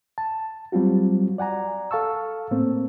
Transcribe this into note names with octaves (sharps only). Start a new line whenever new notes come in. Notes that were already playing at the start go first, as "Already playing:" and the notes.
A5
F#3 G3 C4 F4 F#4
D5 F#5 G#5 A#5
A4 F5 A5 C#6 E6
A2 A#3 C4